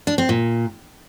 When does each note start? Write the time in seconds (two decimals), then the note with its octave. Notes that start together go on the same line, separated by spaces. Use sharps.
0.07 D4
0.18 C4
0.29 A#2